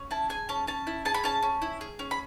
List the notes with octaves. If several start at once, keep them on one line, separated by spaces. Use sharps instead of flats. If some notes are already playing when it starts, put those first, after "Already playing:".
Already playing: C#4
E4 A5
G#4 G#5
C#4 A5
C#4 A5
E4
G#4 A5
B5
C#4 A5
C#4
E4
G#4
C#4
B5